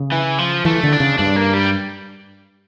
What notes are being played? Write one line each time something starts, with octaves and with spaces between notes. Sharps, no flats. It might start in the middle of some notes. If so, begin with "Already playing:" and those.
Already playing: C#3
E3
F3
E3 A3
D3
D4
C#3
G2 D4
A#3
G3